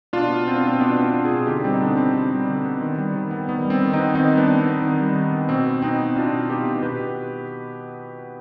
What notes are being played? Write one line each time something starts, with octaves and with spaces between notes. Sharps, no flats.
B2 D4 F4
B3
B3 C4
D4
B2 C4
B2 B3 D4
B3
D4 F4
B3
F4 G#4
B2
D3 D#4 G4
G3 C4
D#4
D3 B3 D4
B3 C4
D3
G3
D3
B3
D#3
G3
D#3
B3
D#3 B3
G3
C4
D#3
B3 C4 D#4
D#3 C4 D#4
G3
B3 D4
D#3
B3 C4
D#3
G3
D#3
B3
B2 C4
B3
B3 C4 D#4
B2
B2 D4 F4
B3
B3 D#4 G4
B2
B2 G4 B4
B3